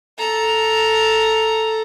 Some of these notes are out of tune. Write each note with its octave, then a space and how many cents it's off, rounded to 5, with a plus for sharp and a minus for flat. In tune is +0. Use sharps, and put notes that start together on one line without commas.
A4 +0 A#5 +0